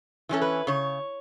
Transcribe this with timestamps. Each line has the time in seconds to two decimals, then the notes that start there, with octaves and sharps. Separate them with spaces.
0.29 E3 G3 C#4 A4
0.42 B4
0.67 C#3 C#5